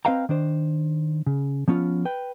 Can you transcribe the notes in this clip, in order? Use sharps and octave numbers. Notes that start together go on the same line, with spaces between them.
C4 B4 D#5 F5 G5 A#5
D#3 D4 C5
C#3
F3 B3 C#4 F4
B4 G5